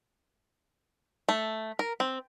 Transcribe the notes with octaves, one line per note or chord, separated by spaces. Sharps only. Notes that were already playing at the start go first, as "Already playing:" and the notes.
A3
A#4
C4